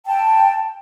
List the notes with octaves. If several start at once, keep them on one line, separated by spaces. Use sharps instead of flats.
G5 A5